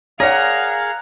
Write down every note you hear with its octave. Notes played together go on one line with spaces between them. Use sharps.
G#4 A#4 C#5 D5 F5 F#5 A#5